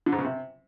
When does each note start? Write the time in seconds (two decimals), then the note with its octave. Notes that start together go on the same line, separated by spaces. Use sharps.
0.06 D3
0.12 G#2
0.18 C#3
0.24 C3